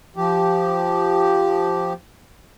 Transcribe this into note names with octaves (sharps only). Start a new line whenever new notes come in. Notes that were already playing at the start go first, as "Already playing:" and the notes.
F3 G4